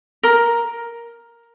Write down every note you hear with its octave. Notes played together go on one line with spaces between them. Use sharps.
A#4